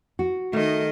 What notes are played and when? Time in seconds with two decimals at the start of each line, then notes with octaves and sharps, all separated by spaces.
0.19 F#4
0.53 D#3 A3 D#5